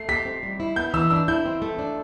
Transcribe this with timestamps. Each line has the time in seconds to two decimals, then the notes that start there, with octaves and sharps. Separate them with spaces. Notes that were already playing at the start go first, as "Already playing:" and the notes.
Already playing: A3 C7
0.09 G4 B6
0.25 C4
0.43 G3
0.60 E4
0.76 B3 G6
0.94 E3 E6
1.10 D4 E6
1.28 E4 G6
1.46 C4
1.62 A3
1.79 D4